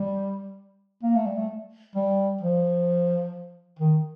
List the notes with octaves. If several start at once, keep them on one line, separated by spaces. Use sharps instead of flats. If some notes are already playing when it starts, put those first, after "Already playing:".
Already playing: G3
A#3
A3
G3
A3
G3
F3
D#3